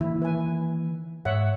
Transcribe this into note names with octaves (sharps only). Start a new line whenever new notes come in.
D#3 E3 A#3 E4
B4 G#5
G#2 C#5 E5 F#5